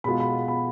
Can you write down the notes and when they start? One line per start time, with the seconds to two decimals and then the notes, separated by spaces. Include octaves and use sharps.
0.04 B2 G#3 B3 F4 B5
0.20 B5
0.48 B5